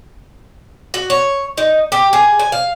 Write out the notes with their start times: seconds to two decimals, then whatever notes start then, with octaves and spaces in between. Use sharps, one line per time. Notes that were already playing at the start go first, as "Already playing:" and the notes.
0.94 F#4
1.10 C#5
1.58 D#4
1.92 G4
2.13 G#4
2.39 G#5
2.52 F5